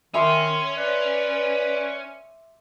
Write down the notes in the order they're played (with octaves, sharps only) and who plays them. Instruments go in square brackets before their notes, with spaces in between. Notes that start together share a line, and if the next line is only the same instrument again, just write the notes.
[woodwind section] D#3 [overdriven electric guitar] C#4 [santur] E5 C6 D6
[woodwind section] B4 D5